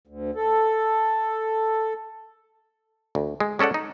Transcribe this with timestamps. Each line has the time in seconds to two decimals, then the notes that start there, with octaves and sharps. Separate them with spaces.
0.07 D2
0.35 A4
3.15 D2
3.40 G#3
3.59 G#3 C#4 A4 D5 F#5
3.74 D#4